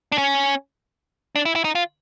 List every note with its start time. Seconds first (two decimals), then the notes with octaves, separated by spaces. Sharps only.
0.12 D4
0.18 C#4
1.36 D4
1.45 E4
1.56 E4
1.64 D#4
1.75 F4